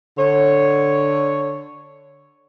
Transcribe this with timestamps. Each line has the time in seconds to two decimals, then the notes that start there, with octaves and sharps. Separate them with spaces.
0.18 D3 C#5